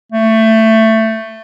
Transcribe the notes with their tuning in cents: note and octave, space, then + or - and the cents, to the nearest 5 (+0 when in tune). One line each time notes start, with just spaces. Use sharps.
A3 +15